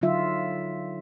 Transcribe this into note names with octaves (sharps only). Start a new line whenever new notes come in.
D3 F#3 D#4 F4 E5